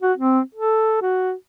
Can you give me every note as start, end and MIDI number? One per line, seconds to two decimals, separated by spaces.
0.02 0.13 66
0.17 0.40 60
0.54 0.99 69
1.02 1.33 66